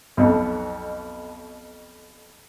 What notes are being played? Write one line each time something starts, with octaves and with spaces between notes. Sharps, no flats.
B1 F2 B2